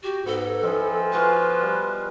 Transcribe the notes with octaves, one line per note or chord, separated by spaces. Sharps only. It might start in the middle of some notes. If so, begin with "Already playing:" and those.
F#4 G4
G#2 B3 A4
D#3 F3 E4 G#5
F4 F#4 G#4 B4
G3